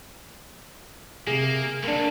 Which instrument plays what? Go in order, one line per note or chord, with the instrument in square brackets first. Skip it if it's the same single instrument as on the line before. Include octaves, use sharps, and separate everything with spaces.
[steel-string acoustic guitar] C3 G#4 [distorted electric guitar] A#3
[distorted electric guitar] D3 F#3 [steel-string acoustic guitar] A#3 D4